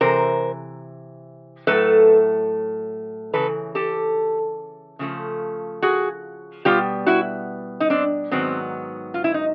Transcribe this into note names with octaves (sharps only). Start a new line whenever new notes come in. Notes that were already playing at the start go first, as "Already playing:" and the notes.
C3 E3 A#4 C5
A2 F#3 A3 A4 B4
C#3 E3 A4 B4
G4 A4
C#3 F3 A3
F#4 G#4
B2 G3 B3 F4 G4
E4 F#4
D#4
C4 D4
G#2 D#3 F#3 B3 C4
F4
E4
D#4